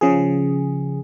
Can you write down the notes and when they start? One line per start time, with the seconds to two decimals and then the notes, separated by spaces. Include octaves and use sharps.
0.01 C#3 F3 G#4